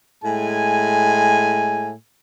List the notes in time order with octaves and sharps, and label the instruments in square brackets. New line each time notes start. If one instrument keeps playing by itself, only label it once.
[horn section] A2 G#3 G#5